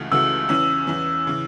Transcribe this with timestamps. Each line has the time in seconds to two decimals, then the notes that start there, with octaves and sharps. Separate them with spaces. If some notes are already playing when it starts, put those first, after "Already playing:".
Already playing: C#2 C#3 E3 A3 F#4
0.11 C#2 C#3 E3 A3 F#4 E6
0.49 E2 E3 C#4
0.87 E2 E3 C#4
1.27 C#3 E3